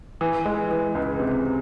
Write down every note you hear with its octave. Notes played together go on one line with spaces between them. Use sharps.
E3
G#3
E3
C#2
C3